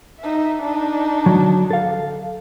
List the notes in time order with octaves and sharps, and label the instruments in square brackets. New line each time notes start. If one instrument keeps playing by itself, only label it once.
[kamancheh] D#4 E5
D4 D#4
[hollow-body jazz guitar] D3 F#3
A4 F5